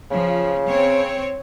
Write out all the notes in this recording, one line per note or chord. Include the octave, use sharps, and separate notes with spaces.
C#3 F3
C4 C#5